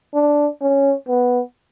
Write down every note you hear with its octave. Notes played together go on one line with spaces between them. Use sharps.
D4
C#4
B3